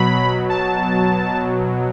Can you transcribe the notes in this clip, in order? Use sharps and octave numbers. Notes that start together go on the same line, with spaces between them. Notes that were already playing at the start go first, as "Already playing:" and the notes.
Already playing: B2 F#3 B5
A5